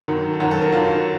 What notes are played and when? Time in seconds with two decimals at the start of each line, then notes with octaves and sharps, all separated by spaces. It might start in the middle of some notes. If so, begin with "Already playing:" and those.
0.08 F#2 D#3 F#3
0.33 A4
0.40 F#2 D#3 F#3 F#4
0.51 A4
0.61 A#4
0.72 F#2 D#3 F#3 F4